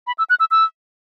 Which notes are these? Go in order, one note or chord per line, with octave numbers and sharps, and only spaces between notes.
B5
E6
F#6
E6
E6